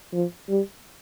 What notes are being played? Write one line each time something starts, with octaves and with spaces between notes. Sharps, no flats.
F3
G3